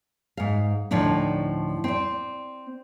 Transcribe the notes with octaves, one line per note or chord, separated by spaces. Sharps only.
G#2 F5
D2 A2 F3 D4 D#4
C4 D5